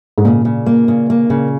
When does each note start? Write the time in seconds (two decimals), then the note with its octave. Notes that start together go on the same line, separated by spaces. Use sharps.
0.18 G#2
0.25 A#2 C#3
0.45 C#3
0.66 A#3
0.88 C#3
1.10 A#3
1.30 C#3